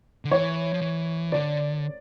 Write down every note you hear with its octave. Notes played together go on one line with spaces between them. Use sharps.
D3
E3 C#5
F3
E3
D3 D5